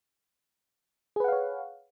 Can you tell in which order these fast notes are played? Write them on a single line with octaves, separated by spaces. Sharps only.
G#4 B4 F#5 F5 C#5